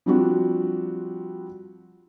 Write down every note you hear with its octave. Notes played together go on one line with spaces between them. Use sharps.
F3 G3 C4 D4 F#4